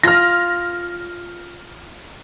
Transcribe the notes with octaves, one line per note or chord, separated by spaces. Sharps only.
F4 F6 A#6